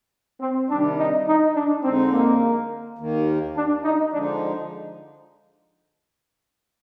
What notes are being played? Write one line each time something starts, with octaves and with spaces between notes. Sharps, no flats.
C4
C3 D#3 G3 D4
D#4
D#4
D4
F2 D3 G#3 C4 D#4
A#3
D#2 D#3 A#3
D4
D#4
D3 F3 G#3 D4 D#4